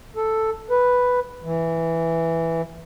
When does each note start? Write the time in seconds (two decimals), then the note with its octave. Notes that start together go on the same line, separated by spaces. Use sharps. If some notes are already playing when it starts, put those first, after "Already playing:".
0.16 A4
0.70 B4
1.43 E3